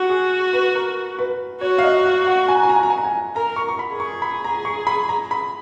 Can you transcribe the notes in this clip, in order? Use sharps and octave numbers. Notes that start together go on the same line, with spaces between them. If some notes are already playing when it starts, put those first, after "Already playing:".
Already playing: F#4 F#5
G#4
B4
A#4
B4
F#4 C#5
F5
D#5
F5
F#5
G#5
A#5
G#5
A#5
G#5
A#5
G#5
A#5
G#5
A#4 A#5
C#6
C#6
B5
G#4
C#6
B5
A#5
C#6
B5
A#5
B5